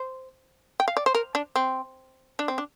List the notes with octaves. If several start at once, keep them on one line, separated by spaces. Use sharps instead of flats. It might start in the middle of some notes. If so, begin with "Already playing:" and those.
Already playing: C5
G5
F5
D5
C5
A#4
D4
C4
D4
C4
D4